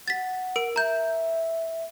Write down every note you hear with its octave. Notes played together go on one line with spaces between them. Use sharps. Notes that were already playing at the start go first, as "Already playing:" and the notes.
F#5 A6 B6
A#4 D7
E5 A#5 G6